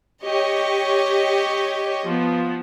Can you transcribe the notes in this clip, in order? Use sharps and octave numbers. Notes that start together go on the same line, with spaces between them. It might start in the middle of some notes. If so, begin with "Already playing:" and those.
G4 C#5 D#5 C#6
F3 B3